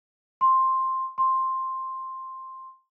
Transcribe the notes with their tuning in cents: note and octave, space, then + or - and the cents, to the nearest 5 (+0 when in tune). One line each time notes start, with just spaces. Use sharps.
C6 +10
C6 +10